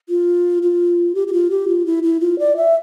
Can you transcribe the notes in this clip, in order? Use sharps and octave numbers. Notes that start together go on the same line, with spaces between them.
F4
F4
G4
G4
F4
G4
F4
E4
E4
F4
D5
E5